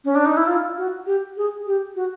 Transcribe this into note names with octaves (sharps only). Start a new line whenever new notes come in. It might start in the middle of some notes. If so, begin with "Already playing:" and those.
C#4
D4
D#4
E4
F4
F#4
G4
G#4
G4
F#4